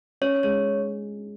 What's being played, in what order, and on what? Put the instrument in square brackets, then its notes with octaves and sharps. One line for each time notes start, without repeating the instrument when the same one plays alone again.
[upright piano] C#4 [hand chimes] C#5
[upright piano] G#3 [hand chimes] C#5